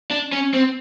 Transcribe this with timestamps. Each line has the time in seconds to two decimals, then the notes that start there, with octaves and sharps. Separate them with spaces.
0.11 D4
0.32 C#4
0.54 C4